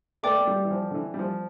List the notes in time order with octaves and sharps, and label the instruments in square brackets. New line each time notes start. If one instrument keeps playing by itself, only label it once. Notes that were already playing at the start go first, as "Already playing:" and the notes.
[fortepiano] A3 [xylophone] B4 D5 G5 D6
[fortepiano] A3
G3
E3
F3
D3
E3
G3
F3